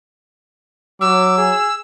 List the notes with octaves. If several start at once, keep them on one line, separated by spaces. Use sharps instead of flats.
F#3 D6 E6
G#4